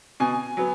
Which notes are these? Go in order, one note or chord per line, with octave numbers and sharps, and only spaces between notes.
B2 G#5
F#3 B3